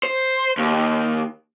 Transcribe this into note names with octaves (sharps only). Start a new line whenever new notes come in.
C5
D#2